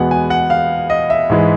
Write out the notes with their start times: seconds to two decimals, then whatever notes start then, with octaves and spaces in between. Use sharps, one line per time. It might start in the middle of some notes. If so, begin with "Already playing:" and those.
Already playing: E2 B2 G#3 B3 F#5
0.11 G#5
0.30 F#5
0.50 F5
0.90 D#5
1.10 E5
1.30 G#2 E3 G#3